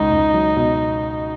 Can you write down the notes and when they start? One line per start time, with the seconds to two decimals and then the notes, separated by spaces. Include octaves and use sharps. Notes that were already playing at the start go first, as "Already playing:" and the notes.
Already playing: C#2 B2 D#4
0.11 C#2
0.34 F#3
0.57 B2